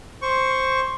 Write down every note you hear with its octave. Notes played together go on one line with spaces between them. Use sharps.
C5 C#6